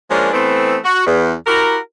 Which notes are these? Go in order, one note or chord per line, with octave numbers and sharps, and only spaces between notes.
F3 G#3 A#3 C#4 D4 A#4
E3 A3 B3 C4
F#4
E2
E4 F#4 G4 A#4